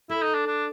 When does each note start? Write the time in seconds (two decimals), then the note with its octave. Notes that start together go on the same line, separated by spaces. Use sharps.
0.09 E4 A4
0.23 D#4
0.34 D4
0.46 D4